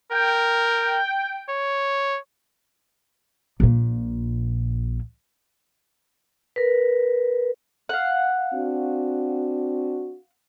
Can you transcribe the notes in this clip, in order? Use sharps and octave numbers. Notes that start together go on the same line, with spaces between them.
A#4 G5
C#5
A#1 A#2
A#4 B4
F5 F#5
C4 D4 F#4